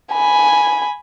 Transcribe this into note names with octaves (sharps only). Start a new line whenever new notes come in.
G#5 B5